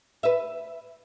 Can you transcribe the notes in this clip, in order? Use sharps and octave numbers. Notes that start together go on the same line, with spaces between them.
B4 E5